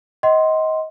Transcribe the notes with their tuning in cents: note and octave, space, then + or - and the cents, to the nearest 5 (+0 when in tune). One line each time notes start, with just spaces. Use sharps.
D#5 +25 F#5 +35 C6 +0